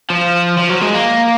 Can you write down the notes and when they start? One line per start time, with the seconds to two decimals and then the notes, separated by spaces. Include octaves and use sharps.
0.10 F3
0.58 F3
0.70 F#3
0.81 G#3
0.94 A#3